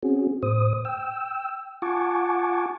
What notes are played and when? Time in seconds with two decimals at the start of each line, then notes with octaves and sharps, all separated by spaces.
0.03 C4 C#4 F#4 G#4
0.43 A2 C5 D#6
0.85 G5 E6
1.82 F4 F#5 G#5 A5 C#6 D6